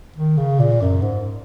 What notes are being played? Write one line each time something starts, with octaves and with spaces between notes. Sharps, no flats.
D#3
C#3
A#2
F#2
G#2